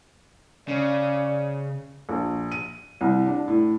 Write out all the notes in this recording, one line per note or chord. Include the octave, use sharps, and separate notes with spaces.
C#3 D5
A#1
D#7
C2
D4
A2